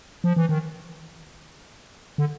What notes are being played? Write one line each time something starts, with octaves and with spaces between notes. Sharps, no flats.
F3
E3
D#3
D3